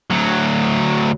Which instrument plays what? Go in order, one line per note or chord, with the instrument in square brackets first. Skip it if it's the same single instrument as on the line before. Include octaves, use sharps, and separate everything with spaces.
[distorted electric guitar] D2 F#3